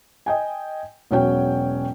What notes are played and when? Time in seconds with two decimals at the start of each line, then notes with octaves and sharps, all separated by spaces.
0.26 D#5 G5 G#5
1.11 E1 F#3 C#4 F#4 C#5 G5